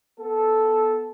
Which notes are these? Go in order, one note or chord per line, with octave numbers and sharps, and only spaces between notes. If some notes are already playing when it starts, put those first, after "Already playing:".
B3 A4